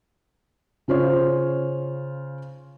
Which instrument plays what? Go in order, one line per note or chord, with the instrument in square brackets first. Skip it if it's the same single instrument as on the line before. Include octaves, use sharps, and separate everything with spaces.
[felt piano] C#3 F4 C5 C#5